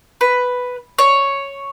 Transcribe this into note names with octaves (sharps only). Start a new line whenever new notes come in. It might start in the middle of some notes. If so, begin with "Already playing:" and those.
B4
C#5